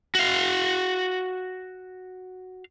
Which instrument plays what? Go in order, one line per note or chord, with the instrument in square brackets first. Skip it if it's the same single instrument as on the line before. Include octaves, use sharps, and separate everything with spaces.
[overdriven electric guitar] F#4 F5